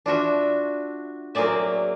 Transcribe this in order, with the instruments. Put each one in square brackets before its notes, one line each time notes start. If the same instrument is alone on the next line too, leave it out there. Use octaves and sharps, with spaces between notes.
[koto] D4 F4 F#4 E5
F#3 A#3 C4 G#4 D5 E5